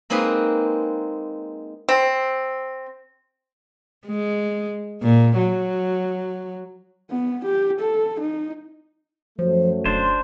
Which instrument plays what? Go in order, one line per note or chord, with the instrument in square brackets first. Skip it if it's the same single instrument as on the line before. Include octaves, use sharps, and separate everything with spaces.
[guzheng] G#3 A#3 C4 D#4 G#4 B4
[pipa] C4
[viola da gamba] G#3
A#2
F#3
[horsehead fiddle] B3
G4
A4
D#4
[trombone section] F#2 F#3 A3 [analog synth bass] F3 [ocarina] C5
[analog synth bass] E1 [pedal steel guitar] D4 C5 [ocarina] C6